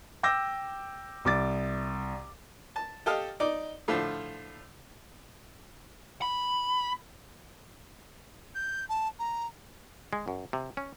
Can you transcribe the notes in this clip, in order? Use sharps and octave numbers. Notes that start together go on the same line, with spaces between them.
G5 D6 E6 G6 A#6
C2 D6 A6
A5
G4 A4 D#5 F5
D#4 D5
A2 D3 F3 F4
B5
G6
A5
A#5
G#3
F#2
C3
C#4